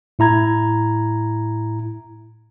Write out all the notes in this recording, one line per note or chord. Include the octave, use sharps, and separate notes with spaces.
A2 E4 A#5 G#6